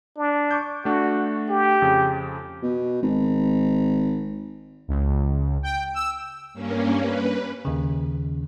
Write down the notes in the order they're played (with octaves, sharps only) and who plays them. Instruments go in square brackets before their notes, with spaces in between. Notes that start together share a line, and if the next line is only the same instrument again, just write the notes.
[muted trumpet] D4
[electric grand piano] C#6 D6 G6
[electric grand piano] A3 D4 [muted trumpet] F#4
[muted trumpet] G4
[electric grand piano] F2 C#3
[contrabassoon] B2
G#1
[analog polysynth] C#2
G5
E6
[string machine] G2 A#3 C#4
B4
[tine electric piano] D#2 C#3